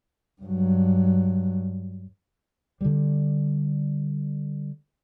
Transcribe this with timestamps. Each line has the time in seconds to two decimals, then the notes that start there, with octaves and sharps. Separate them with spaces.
0.42 G2 F#3
2.81 D3 G3